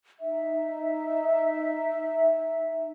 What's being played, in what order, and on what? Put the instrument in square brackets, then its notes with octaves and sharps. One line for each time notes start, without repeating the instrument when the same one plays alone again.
[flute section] D#4 E5